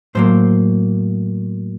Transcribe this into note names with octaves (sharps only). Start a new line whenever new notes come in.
A2 F#3 A#3 C5